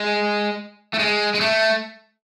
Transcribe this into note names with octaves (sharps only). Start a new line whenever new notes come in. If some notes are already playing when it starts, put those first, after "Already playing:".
Already playing: G#3
A3
G#3
G#3
A3